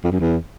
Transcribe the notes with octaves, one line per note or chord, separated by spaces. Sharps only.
F2
F#2
E2